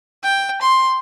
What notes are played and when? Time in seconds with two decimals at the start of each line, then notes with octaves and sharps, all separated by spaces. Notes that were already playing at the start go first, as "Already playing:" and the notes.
0.23 G5
0.62 C6